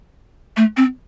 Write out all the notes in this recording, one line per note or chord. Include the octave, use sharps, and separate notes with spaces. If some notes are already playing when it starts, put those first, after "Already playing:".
A3
C4